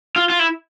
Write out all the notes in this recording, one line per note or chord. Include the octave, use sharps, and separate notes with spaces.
F4
F4
E4